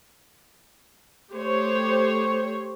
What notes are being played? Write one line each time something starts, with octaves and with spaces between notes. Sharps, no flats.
A3 G4 C5 C#5